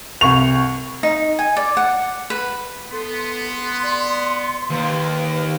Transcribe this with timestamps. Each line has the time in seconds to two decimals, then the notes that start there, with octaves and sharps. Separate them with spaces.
0.21 C2 C#6 F7
1.03 D#4
1.39 G#5
1.57 D5
1.77 F#5
2.30 B4
2.92 B3 A4 C6
3.83 D5
4.70 D#2 B4